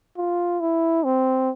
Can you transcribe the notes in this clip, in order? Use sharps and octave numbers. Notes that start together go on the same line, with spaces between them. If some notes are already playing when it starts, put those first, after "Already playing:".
F4
E4
C4